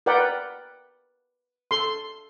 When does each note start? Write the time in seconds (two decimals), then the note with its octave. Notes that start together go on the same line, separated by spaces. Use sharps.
0.06 A#4 B4 D5 F#5 G5
1.71 A4 C6